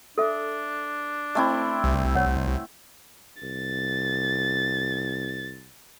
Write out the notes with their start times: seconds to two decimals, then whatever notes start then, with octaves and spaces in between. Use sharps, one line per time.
0.18 D4 A4 E5
1.35 A3 C4 E4 D#5
1.84 C2
2.15 C#5 F#5
3.43 C2 A6